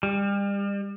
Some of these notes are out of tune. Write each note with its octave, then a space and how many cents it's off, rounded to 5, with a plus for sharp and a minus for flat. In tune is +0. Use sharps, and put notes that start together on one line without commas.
G3 +35